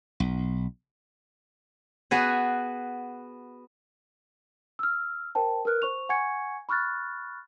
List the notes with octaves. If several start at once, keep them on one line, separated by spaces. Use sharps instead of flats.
B1
B3 F#4 G#4
E6 F6
A#4 C5 G5 A5
A#4 B4 F6 F#6
C5 C#6 F7
F#5 G#5 C#6 G#6 C#7
B5 C#6 F6 F#6 A6